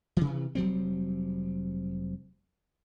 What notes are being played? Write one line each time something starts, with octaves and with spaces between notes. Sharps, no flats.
C3 E3
F1 F#3 G3 C4